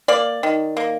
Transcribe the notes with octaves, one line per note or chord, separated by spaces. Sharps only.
A#3 D5
D#3
A#3